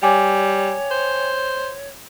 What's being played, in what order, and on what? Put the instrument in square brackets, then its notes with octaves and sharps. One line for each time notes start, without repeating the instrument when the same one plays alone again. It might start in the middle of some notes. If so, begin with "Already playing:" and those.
[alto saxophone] G3 [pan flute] C#5 [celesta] G5 G#5 D6
[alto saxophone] C5